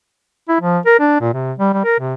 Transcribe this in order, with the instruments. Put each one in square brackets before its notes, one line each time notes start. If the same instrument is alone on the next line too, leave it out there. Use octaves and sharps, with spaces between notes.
[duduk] E4
F3
A#4
D4
A#2
C3
G3
G3
A#4
C3